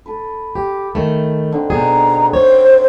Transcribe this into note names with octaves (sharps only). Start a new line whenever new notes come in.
A4 B4
G4
D#3 A3
D3 C4 D#4
B2 G#4 A#5
C5 C#5